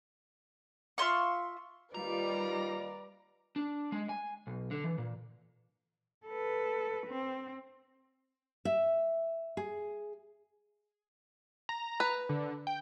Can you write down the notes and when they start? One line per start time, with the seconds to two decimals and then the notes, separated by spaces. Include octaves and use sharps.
0.98 F4 E5 C6 C#6
1.95 D#2 G3 F4 B4 D5 D#5 A#5
3.56 D4
3.92 G#3
4.09 G#5
4.47 B1
4.71 D3
4.84 E3
4.98 A#2
6.26 A4 B4
7.07 C4
8.65 E5
9.57 G#4
11.69 A#5
12.00 B4
12.29 D3
12.67 G5